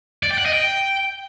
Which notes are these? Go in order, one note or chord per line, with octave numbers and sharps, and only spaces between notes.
D5
G5
F#5
D#5
G5